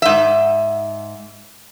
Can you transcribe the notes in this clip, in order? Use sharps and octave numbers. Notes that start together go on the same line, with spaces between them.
G#2 E5